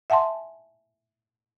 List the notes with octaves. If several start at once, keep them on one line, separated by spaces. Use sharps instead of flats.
E5 F#5 G#5 A5 C6